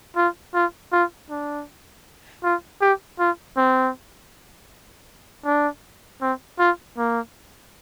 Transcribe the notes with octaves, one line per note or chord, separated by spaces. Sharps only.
F4
F4
F4
D4
F4
G4
F4
C4
D4
C4
F4
A#3